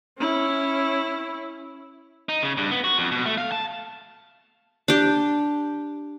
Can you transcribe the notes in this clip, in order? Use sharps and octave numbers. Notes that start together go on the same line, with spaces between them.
C#4 E4
D#4
C#3
G2
B3
F#4
F2
B2
A3
F5
A5
D4 G4